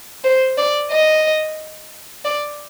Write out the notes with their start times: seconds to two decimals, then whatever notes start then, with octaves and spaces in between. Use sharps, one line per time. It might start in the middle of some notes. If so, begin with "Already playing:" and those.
0.24 C5
0.58 D5
0.91 D#5
2.25 D5